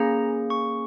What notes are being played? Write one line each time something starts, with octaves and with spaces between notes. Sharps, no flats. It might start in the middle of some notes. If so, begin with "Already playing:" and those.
Already playing: A#3 C#4 G#4 A#5
C#6